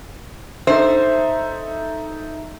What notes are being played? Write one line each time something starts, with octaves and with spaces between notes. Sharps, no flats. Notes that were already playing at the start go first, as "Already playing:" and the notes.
D#4 A4 C5 E5